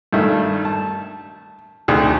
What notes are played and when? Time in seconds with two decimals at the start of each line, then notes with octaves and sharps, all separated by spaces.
0.13 G2 D#3 A3
0.65 A5
1.88 G#1 D2 D#3 G#4